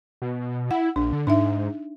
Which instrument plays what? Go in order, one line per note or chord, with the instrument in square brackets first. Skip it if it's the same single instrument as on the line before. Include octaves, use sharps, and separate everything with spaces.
[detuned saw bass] B2
[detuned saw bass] E4 [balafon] F#5
[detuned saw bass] A#1 [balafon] D4
[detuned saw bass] D3
[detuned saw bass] G#2 [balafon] D4 D#4 E5